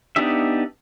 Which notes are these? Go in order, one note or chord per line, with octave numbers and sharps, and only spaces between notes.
B3 D4 D#4 G4 E5